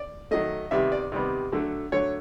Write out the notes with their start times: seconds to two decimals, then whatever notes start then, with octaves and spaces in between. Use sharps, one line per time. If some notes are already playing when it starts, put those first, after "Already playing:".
Already playing: D5
0.31 D#3 F#3 A3 D#5
0.71 C3 D#3 G3 B3 E5
0.92 D5
1.12 C3 D#3 G3 B3
1.52 D3 F#3 A3
1.92 D3 F#3 A3 C#5